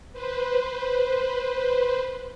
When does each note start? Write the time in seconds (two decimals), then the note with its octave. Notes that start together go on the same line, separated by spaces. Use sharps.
0.13 B4 C5